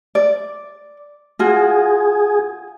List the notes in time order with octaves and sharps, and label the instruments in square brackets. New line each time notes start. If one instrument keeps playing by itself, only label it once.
[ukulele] D5
[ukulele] F4 F#4 [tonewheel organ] G#4